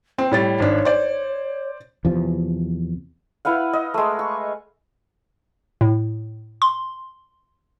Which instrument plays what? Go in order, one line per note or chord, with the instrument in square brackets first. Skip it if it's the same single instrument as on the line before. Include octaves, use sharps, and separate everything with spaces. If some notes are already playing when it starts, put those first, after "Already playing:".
[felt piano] C4 [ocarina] C5
[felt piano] A2 G3 A6 [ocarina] C#5
[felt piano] G#1 D4
C5 D5
[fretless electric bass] E2 C3 F3
[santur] E4 B4 F5 F#5
D#5
G#3 A3
C#6
[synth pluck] A2
C6